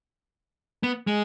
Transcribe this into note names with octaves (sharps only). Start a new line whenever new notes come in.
B3
G#3